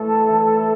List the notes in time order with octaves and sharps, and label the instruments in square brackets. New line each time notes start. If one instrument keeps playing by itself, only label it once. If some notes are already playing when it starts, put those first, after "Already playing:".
Already playing: [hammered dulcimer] A2 E3 A3 [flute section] A4
[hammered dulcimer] E3 A3